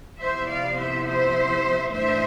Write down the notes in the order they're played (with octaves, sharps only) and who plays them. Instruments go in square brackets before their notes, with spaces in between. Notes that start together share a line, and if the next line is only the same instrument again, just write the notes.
[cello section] C3 F3 B3 E4 C5 E5
D5 F5
C5 E5
C5 E5
A2 E3 A3 D4 C5 E5